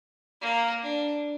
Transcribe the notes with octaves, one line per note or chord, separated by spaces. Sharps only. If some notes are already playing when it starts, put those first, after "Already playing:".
A#3
D4